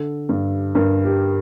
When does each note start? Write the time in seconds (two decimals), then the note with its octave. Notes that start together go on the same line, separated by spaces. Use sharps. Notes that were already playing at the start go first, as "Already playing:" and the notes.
Already playing: D3 A4
0.29 G2
0.75 G2 A#4
1.05 G4